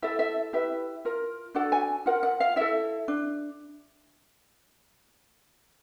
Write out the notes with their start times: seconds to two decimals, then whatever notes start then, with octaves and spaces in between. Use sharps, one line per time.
0.02 E4 A4 E5
0.19 E5
0.53 E4 G4 B4 E5
1.05 F4 A#4
1.55 D4 F#4 A4 F#5
1.72 G#5
2.06 F4 A#4 F#5
2.23 F#5
2.40 F5
2.56 E4 A4 E5
3.08 D4